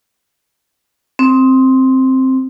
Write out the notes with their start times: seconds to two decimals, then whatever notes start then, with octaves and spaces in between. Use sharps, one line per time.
1.19 C4